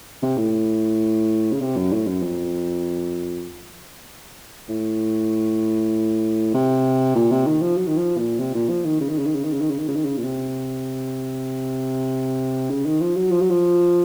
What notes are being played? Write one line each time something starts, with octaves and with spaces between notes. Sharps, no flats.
C3
A2
C#3
C3
F#2
A2
F#2
F2
A2
C3
A#2
C3
D#3
F3
F#3
D#3
F3
A#2
C3
A#2
F3
D#3
C#3
D#3
C#3
D#3
C#3
D#3
C#3
D#3
C#3
D#3
C#3
D#3
C#3
A#2
C3
C#3
D#3
F3
F#3
F3
F#3
F3